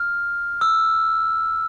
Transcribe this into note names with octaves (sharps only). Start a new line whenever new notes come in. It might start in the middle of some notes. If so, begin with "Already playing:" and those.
Already playing: F6
E6